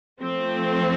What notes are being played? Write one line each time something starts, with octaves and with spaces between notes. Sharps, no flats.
F3 A3 C4